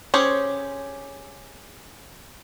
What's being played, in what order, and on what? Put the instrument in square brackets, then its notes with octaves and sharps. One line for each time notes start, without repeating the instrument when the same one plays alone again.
[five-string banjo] C#4 G4 G#4 C5 C#5